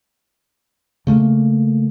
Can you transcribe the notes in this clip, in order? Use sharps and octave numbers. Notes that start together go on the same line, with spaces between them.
C#3 A3 A#3